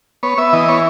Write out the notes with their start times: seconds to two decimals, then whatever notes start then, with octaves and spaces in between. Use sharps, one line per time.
0.23 B3 C#5
0.38 B3 E5
0.53 E3 D#5
0.68 B3 C#5